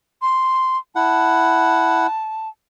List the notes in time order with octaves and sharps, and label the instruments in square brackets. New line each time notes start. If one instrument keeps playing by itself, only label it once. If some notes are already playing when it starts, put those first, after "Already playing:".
[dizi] C6
[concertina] E4 F#5 [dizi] A5